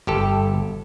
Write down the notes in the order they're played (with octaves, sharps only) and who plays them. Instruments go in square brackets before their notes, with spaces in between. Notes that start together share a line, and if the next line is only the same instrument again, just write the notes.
[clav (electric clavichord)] G1 G4 A4